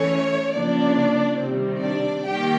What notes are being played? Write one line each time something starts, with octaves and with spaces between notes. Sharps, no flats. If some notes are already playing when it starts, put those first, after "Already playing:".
Already playing: E3 A3 C#4 C#5
C#3 F3 A#3 D4 D5
C3 D#3 G3 C4
D4 D5
D#3 G3 A#3 G4 G5